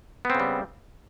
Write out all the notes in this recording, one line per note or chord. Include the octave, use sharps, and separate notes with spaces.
C#3 G3 B3 C4